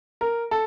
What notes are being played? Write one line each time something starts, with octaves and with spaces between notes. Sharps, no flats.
A#4
A4